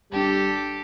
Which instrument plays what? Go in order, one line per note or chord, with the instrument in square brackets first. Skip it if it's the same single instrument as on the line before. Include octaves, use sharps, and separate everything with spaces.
[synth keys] G#1 D4 [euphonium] G3 [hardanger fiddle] G4 A4